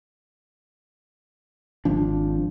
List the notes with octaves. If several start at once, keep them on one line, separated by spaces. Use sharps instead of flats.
G#1 F3 D4